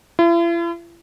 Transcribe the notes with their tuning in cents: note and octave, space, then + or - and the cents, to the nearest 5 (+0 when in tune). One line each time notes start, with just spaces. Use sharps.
E4 +45